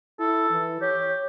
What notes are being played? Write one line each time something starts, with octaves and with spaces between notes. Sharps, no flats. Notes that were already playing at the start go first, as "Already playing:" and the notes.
E4 A4
E3
G4 C#5